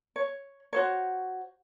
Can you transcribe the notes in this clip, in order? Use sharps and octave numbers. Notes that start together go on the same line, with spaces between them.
C#5
F#4 C5 C#5